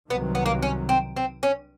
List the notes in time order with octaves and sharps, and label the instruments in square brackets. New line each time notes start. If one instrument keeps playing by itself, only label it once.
[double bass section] C2 C3 D#3 F#3 [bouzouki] B3
[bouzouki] B3
A#3
C#4
C4
C4
C#4